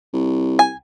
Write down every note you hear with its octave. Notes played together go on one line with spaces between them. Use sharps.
C2
G#5